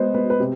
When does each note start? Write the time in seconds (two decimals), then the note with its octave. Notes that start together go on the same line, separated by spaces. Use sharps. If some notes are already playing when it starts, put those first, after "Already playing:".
Already playing: G#3 B3 C5
0.14 B3 B4
0.30 B4
0.40 C3